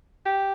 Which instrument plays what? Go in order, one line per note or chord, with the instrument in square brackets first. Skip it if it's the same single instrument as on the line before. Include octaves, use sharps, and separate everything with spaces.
[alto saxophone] G4